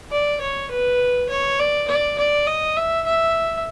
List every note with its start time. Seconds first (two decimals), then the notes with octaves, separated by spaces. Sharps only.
0.11 D5
0.41 C#5
0.71 B4
1.29 C#5
1.59 D5
1.88 D5
2.18 D5
2.47 D#5
2.77 E5
3.06 E5